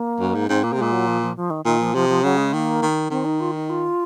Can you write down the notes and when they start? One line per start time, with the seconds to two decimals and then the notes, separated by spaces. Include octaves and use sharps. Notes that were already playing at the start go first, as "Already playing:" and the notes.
Already playing: A#3
0.20 F#2
0.35 G#2
0.48 G#2 C4
0.64 A#2 A#3
0.73 C3
0.78 A#2 G#3
0.92 F#3
1.07 F3
1.22 F3
1.37 F3
1.50 D#3
1.65 A#2 D#3
1.80 F3
1.95 C3 F3
2.09 F3
2.23 C#3 F#3
2.38 G#3
2.53 D#3 A#3
2.82 D#3
3.10 D#3 C4
3.25 D#4
3.41 F4
3.54 D#4
3.70 F4